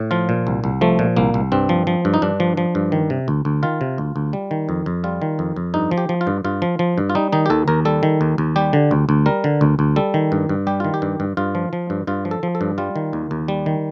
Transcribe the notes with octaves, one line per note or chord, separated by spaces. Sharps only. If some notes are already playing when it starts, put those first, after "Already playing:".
Already playing: A2
F3 F4
A#2
C2
C2
F3 A3
A#2
C2 A#3
C2
G2 C4
F3
F3
G2
D#4
G2 D4
F3
F3
G2
D#3
C3
D2
D2
D#3 F4
C3
D2
D2
G3
D#3
F2
F2
G3 F4
D#3
F2
F2
G2 D#4
F3
G4
F3
F4
G2
G2 F4
F3
F3
G2
F4
G3 D#4
D#3 D#4
G4
D#2 A4
D#2 A#4
G3 A4
D#3
D#2
D#2
G3 G4
D3
D2
D2
G3 A#4
D3
D2
D2
G3 A4
D#3
G2
G2
G3 G4
D#3 F4
G4
G2
G2
G2 F4
F3
F3
G2
G2 F4
F3
A4
F3
A4
G2
G3 F4
D#3
D#2
D#2
G3
D#3